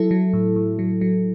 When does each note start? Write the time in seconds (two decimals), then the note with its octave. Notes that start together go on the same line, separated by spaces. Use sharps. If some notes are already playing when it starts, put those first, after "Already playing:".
Already playing: F#3 E4 A4
0.11 F#3
0.33 A2
0.56 A2
0.79 F#3
1.01 F#3